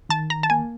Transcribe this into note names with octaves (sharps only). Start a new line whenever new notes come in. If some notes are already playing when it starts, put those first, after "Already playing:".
D#3 A5
A#5
A5
A#3 G#5